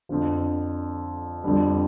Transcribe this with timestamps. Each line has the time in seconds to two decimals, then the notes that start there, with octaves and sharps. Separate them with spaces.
0.09 F2 D3 F3
1.44 F2 D3 G3